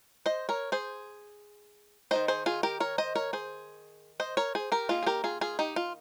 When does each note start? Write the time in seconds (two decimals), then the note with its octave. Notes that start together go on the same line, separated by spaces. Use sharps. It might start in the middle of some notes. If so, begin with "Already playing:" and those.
0.26 C5 D#5
0.49 A#4 C#5
0.72 G#4 C5
2.11 D#3 A#3 D#4 C5 D#5
2.28 G#4 C5
2.46 F4 G#4
2.63 G4 A#4
2.80 A#4 C#5
2.98 C5 D#5
3.15 A#4 C#5
3.33 G#4 C5
4.20 C5 D#5
4.37 A#4 C#5
4.55 G#4 C5
4.72 G4 A#4
4.89 D#3 A#3 D#4 F4 G#4
5.03 G#4
5.06 G4 A#4
5.24 F4 G#4
5.41 F4 G#4
5.59 D#4 G4
5.76 F4